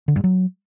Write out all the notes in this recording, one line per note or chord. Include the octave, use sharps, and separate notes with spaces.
D3
G2
F#3